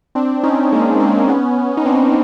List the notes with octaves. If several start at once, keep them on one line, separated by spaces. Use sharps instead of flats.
C4 D4
C#4 D#4
G#3 A#3
A#3 C4
B3 C#4
D#4
C4 D4